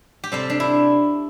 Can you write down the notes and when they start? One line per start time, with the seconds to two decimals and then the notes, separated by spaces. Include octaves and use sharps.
0.24 G4
0.32 C3 G3 C4 A4
0.50 D4
0.60 E4